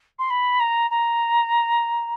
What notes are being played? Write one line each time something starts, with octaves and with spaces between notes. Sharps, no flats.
C6
B5
A#5
A#5